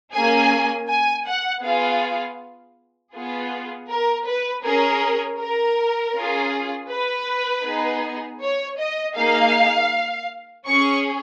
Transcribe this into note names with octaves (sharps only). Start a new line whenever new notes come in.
A#3 C#4 G#4 G#5
G#5
F#5
B3 F4 G#4 F5
B3 F4 G#4
A#4
B4
C#4 G#4 A#4
A#4
C#4 F4 G#4
B4
B3 D#4 G#4
C#5
D#5
A#3 D#4 G#4 F5
C#4 G#4 C#6